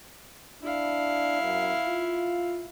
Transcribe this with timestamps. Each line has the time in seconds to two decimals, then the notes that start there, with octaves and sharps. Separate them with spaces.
0.63 D4 E4 F5
1.42 F#2
1.89 F4